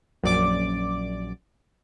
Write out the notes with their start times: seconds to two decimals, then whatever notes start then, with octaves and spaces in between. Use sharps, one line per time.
0.23 A#1 F#2 D5 D6